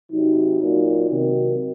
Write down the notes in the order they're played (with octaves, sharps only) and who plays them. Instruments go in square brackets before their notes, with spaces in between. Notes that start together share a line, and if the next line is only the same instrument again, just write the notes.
[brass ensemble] C3 F#3 D#4
A#2 F#3
C3 D#3 F#3